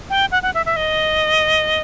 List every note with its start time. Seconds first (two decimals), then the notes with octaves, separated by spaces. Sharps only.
0.10 G5
0.32 F#5
0.43 F#5
0.54 E5
0.66 E5
0.76 D#5